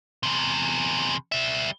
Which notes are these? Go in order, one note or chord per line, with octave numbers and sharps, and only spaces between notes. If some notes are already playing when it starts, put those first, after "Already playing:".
E2 C3
G3 E5